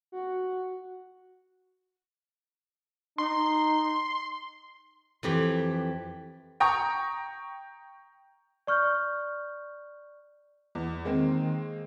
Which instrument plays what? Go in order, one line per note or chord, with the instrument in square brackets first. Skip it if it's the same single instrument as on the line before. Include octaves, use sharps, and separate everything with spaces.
[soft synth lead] F#4
[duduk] D#4 [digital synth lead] C6
[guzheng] F2 E3 G4
[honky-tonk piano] G5 A#5 C#6 D#6
[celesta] D5 C#6 F6 G6
[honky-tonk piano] E2
[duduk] D#3 [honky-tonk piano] G#3 A#3 C4